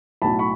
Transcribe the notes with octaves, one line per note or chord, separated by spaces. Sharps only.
B1 A2 F#3 A5 B5
B5 C#6